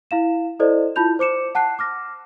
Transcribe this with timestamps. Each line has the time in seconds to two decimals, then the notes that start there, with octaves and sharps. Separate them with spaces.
0.11 E4 F5 E7
0.60 E4 A4 C5 D5 D#5
0.96 E4 F4 A5 B5 G6 F7
1.19 C5 D6 C#7 E7
1.55 F#5 A5 F#6 C7
1.79 D6 F6 A#6